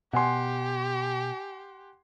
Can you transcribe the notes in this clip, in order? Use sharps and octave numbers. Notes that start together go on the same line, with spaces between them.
B2 G4 F#5 G#5 C6